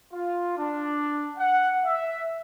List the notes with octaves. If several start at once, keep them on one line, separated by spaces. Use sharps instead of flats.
F4
D4
F#5
E5